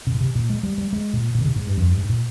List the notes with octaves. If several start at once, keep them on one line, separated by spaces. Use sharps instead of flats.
C3
A#2
C3
A#2
G#3
G3
G3
G#3
A#2
A#2
D3
C3
G#2
G2
F2
G2
G#2
A#2